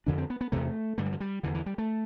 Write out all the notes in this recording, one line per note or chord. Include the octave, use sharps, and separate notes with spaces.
F2 D3 D4
C4
B3
B3
E2 C3 A3
G2 D3 A3
G3
F3
G3
E2 D3 E3
E3
G3
A3